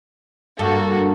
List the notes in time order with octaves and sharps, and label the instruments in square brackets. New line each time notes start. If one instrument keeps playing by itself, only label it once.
[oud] G2 [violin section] A#3 F#4 A4